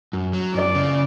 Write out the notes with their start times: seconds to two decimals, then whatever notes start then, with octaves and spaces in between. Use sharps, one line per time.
0.13 F#2
0.33 F#3
0.54 F#2 D5
0.75 C#3